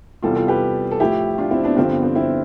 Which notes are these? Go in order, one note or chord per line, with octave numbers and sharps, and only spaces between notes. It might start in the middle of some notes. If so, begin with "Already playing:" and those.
E2 C3 E3 G3 F4 A4
F4 A4
G4 B4
A4
A2 F3 E4 G4
D4 F4
C4 E4
B3 D4
G2 D3 F3 C4
B3
C4
C4 E4